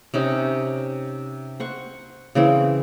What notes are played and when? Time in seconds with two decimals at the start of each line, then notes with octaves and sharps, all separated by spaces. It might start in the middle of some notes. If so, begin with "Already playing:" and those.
0.14 C3 C#4 D#4
1.60 C5 F#5 C#6
2.35 C#3 E3 C4